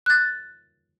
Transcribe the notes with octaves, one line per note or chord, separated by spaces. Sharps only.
F#6 A6